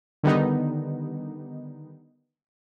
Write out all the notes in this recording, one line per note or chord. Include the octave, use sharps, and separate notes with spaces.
D3 D#3 G3 B3 D#4